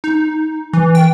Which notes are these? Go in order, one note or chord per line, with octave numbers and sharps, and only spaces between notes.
D#4
E3
G5